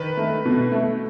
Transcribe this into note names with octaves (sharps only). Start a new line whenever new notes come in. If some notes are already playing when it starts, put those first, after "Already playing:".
Already playing: D#3 B4
A3
B2
A3